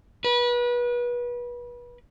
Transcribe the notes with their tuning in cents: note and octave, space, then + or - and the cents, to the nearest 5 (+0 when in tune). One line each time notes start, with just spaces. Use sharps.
B4 -30